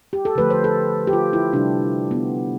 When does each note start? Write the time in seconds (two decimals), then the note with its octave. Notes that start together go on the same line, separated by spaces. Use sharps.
0.13 G4
0.25 A4
0.35 D3 F3 A3 B4
0.50 C5
0.64 A4
1.07 G4
1.13 F4
1.33 E4
1.53 C3 G3 D4
2.11 B3